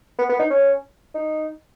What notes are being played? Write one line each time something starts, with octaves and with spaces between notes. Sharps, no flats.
B3
B3
D#4
C#4
D#4